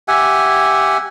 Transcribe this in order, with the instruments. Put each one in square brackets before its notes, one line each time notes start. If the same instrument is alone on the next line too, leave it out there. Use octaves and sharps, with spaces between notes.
[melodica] G4 E5 F#5 G#5